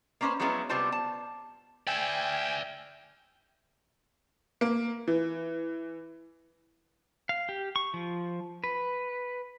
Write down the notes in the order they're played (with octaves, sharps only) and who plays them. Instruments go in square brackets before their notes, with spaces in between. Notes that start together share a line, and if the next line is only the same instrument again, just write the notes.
[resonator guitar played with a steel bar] A#3 B3 C#4 D4 B4 C5
F3 F#3 G#3 B3 C#4 E4
C3 G3 B3 F4 C5 A5
A5
[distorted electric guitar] D5 E5 [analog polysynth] G5 G#5
[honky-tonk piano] A#3
E3
[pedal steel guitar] F5
G4
C#6
F3
B4